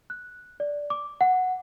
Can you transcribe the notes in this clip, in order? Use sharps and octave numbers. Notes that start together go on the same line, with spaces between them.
F#6
D5
D6
F#5